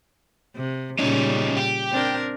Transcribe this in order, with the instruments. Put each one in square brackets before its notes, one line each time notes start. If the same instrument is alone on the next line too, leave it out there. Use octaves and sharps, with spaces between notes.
[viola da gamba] C3
[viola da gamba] A#2 C#3 G3 [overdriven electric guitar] C#4 D#4
[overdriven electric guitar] G4
[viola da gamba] C4 D4 A#4